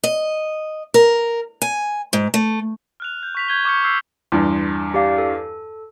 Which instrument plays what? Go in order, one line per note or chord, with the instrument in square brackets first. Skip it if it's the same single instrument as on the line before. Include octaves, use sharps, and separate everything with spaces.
[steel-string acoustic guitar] D#5
A#4
G#5
G#2
A3
[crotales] F6 F#6 F7
G6
C#6 B6 F7
C#6 G6 G#6 D#7 G7
C#6 D6 F6 G6 G#6 C#7
C#6 E6 F6 G6 C7
[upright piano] E2 G2 [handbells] C6
[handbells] G4 D5 F5
A4